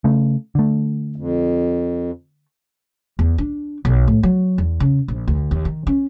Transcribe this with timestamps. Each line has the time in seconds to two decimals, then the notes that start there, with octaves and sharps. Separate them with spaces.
0.04 C#3 A3
0.55 D3 A3
1.16 F2
3.19 E2
3.38 D4
3.85 B1
4.08 A2
4.23 F#3
4.58 E2
4.80 C#3
5.08 A#1
5.28 D2
5.51 D#2
5.65 D#3
5.87 C#4